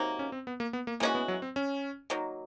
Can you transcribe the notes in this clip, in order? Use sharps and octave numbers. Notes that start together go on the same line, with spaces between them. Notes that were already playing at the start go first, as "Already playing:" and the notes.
Already playing: C3 D#3 F#3 A#3
C#4
C4
B3
A#3
B3
A#3
E3 G#3 A#3 C#4 F#4
B3
F#3
C4
C#4
D#3 F#3 A#3